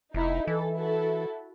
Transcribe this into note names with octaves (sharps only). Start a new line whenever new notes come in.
F1 D#4 E4
E3 A4
E4 F#4 A4